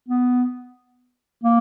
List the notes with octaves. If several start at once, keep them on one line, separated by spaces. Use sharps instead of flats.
B3
A#3